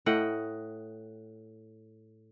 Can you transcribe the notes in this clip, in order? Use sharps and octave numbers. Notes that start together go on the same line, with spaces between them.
A2 D#5 F#5 G5